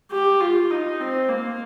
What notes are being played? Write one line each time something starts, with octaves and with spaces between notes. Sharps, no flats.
G4
F4
D#4
C4
A#3